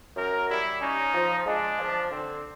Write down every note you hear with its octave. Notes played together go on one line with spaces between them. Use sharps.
F#2 A#4
G3 E4
C#4 D#4
F3
G#3 D4
F3
D3 C4